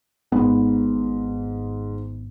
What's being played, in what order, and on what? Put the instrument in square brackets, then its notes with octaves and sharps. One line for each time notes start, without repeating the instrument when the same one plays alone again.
[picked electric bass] G#1 B3 [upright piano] G#2